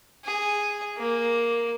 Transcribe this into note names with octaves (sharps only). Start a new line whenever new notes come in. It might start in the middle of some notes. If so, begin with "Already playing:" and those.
G#4
A#3